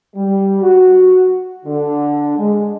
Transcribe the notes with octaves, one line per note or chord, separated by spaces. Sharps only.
G3
F#4
D3
G#3